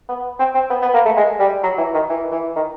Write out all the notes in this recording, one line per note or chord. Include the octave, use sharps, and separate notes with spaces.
B3
C4
C4
B3
B3
A#3
A3
G#3
G3
F#3
E3
D#3
E3
E3
D#3